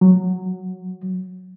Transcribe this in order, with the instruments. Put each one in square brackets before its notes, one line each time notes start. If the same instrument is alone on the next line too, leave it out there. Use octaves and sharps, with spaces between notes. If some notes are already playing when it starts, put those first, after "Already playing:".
[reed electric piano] F#3